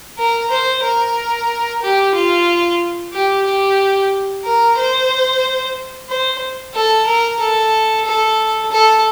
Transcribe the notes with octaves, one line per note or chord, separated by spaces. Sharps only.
A#4
C5
A#4
G4
F4
G4
G4
A#4
C5
C5
A4
A#4
A4
A4
A4